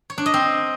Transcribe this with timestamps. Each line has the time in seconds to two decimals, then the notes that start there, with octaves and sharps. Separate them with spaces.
0.10 C#5
0.18 D4
0.26 D#5
0.34 C4